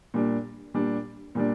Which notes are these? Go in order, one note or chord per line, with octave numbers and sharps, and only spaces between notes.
A#2 G3 D4
A#2 G3 D4
A#2 G3 D4